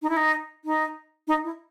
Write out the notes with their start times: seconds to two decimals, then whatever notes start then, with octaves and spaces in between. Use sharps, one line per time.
0.02 D#4
0.09 E4
0.17 D#4
0.65 D#4
1.27 D#4
1.44 E4